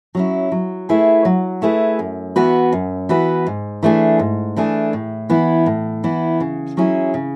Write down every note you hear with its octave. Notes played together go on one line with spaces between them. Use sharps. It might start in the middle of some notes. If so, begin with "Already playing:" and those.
F#3 C#4 E4
F#3
A3 E4 G#4 B4
F#3
A3 E4 G#4 B4
F#2
E3 B3 F#4 B4
F#2
E3 B3 F#4 B4
G#2
E3 A3 D4 G#4
G#2
E3 A3 D4 G#4
A2
E3 B3 E4
A2
E3 B3 E4
C#3
F#3 C#4 E4 G#4
C#3